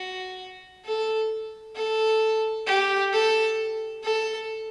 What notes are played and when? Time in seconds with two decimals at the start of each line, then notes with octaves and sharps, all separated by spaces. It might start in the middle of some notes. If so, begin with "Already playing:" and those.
Already playing: F#4
0.85 A4
1.76 A4
2.67 G4
3.13 A4
4.04 A4